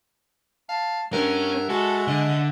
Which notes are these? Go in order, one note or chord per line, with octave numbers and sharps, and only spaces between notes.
F5 A5
G2 C#4 A#4 E5 F#5
G#3 F#4 A4
D3 D#5